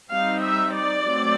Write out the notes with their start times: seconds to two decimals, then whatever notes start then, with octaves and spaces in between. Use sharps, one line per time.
0.10 G3 C4 D#4 F5
0.42 E5
0.73 D5
1.05 F#3 A3 C4